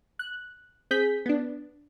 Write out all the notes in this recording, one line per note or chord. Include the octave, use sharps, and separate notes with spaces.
F#6
C4 G#4 G6 B6
B3 D4